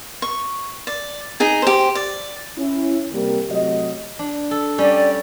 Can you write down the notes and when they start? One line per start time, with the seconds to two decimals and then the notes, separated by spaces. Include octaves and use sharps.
0.22 C#6
0.87 D5
1.40 D#4 G#4 G#5
1.62 G4 C5
1.95 D5
2.58 C#4 E4
3.12 C3 G3 A#3 A#4
3.50 C3 F#3 A3 D#5
4.19 D4
4.51 A4
4.78 G3 C#4 D5